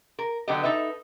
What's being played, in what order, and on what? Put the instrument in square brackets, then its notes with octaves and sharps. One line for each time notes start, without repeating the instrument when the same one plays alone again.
[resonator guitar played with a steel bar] A#4
D3 F#3 B3 G4 D#5
D#4 A4 B4 E5